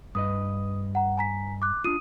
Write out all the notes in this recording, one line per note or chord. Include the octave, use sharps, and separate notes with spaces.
G2 B4 D#5 D#6
F#5 A#5
G#5 A#5 B6
D6 F#6
D4 F4 D#6 D#7